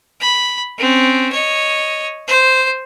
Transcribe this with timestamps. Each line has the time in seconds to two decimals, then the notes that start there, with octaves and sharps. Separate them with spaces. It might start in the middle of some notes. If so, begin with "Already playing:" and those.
0.21 B5
0.78 C4 C#4
1.32 C#5 D#5
2.28 C5